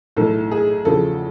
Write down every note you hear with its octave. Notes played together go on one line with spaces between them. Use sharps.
B1 A2 E3 A4
G#4
E2 C#3 F3 A4